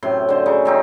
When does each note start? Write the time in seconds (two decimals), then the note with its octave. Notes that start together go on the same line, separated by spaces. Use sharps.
0.03 F#2 A2 C3 C6
0.29 D3 C5
0.46 C#3 D#4
0.65 D#3 C4 D#4